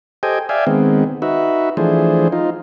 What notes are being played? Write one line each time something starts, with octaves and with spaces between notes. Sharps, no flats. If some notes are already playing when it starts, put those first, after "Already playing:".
G4 A4 C5 D#5 G5 G#5
D5 E5 F5 G5 G#5
D#3 G#3 B3 C4
D#4 F#4 B4 E5
E3 F3 A3 D4 G#4 C5
D#4 F4